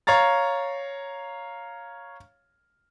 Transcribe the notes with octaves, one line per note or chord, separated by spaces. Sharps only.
C#5 F5 A#5 A6